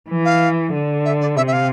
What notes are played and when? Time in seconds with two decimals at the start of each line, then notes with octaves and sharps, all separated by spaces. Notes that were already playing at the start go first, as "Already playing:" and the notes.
0.10 E3
0.25 F5
0.73 D3
1.05 E5
1.21 D5
1.37 C3 E5
1.47 E5
1.53 F5